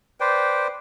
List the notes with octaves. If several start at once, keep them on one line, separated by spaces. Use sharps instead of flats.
B4 C5 D5 G5